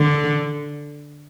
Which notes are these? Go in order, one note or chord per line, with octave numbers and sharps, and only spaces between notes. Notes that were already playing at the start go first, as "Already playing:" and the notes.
Already playing: D3